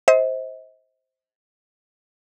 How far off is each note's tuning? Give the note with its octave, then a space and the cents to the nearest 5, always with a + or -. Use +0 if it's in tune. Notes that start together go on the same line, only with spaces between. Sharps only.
C5 +5 D#5 +45